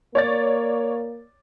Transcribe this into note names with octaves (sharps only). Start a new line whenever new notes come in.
A#3 C#5 D5 A6